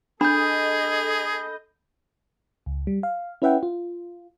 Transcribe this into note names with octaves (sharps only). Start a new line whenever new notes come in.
D4 G#4 A4 D#5 B5 G6
C#2
G3
F5
C#4 E4 B4 E5 F#5 G5
F4